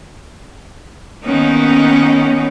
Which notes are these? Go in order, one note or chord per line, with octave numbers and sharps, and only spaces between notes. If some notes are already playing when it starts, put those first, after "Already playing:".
D#3 A#3 B3 C#4 D#4